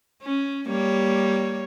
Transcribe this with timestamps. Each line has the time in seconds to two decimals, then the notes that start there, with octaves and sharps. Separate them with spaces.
0.22 C#4
0.68 G3 A#3 C#5